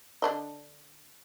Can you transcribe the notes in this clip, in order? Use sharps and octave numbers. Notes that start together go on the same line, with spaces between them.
D3 D4 D#5